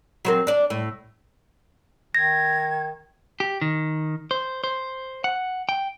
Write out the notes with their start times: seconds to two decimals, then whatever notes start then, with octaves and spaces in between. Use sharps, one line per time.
0.25 F#3 C4 A#4
0.47 D4 D5
0.70 A2
2.15 D#3 G#6 A#6
3.40 G4
3.61 D#3
4.31 C5
4.64 C5
5.24 F#5
5.69 G5